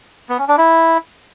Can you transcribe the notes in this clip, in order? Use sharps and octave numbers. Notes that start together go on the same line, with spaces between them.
B3
C#4
D4
E4